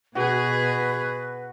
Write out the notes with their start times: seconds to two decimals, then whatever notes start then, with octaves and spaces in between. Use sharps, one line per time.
0.15 B2 F#4 G#4 B4